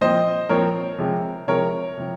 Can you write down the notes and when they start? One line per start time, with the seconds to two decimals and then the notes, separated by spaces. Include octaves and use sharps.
0.01 A#2 F3 C4 C5 D#5
0.49 A#2 F3 C4 A#4 C#5
0.98 C3 F3 G#3 C4
1.48 C3 F3 G#3 C4 A#4 C#5
1.97 C3 F3 C4